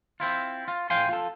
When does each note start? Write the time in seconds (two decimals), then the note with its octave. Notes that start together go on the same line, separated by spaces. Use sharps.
0.20 C4 E4 F4
0.68 F4
0.90 A2 F5 G5 G#5 C6
1.09 F4 A4